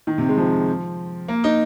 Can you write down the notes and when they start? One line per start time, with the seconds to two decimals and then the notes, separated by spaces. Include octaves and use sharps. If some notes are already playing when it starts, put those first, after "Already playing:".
0.07 D#3
0.18 C3
0.29 G#3
0.37 F3
1.28 A#3
1.44 D#4